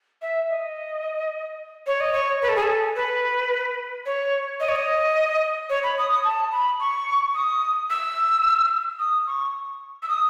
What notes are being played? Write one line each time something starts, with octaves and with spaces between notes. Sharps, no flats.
E5
D#5
C#5
D#5
C#5
B4
A4
G#4
A4
B4
C#5
D#5
C#5
D#5
C#5
B5
D#6
D#6
A5
B5
C#6
D#6
E6
D#6
C#6
E6
D#6